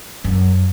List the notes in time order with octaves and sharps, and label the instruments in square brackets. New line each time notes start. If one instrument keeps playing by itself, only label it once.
[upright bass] F#2